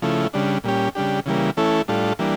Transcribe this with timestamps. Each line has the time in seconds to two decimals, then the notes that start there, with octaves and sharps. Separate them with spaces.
0.02 C#3 F3 A3 E4
0.33 C#3 G3 D4
0.64 A#2 G3 C#4 G4
0.95 C#3 G3 D4 G4
1.26 C#3 E3 G3 A#3
1.57 E3 A3 C#4 E4 A4
1.88 A2 G3 D4 F4 A4
2.19 E3 G3 A#3 D4